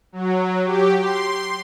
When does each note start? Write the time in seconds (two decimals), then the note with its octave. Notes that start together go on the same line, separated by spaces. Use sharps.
0.12 F#3
0.65 G4
1.00 C6